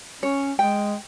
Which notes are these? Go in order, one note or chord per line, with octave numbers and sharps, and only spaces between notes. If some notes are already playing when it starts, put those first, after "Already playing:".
C#4 C#5
G#3 G5